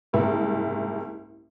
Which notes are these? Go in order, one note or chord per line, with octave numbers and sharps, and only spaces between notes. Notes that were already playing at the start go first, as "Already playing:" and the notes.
F#1 C2 G#2